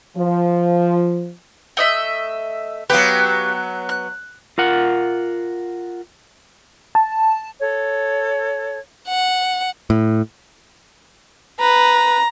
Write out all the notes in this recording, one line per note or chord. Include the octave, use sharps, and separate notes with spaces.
F3
A3 D#5 E5
F#3 B3 G4 B4 F5
F#6
F4 A#4 F#5
A5
A4 C#5
F#5
A2
B4 A#5